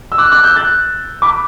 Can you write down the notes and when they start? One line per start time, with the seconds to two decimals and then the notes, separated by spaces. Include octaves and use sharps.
0.12 E6
0.18 D6 F#6
0.31 D6 F#6
0.43 E6 G6
0.56 F#6 A6
1.22 B5 D6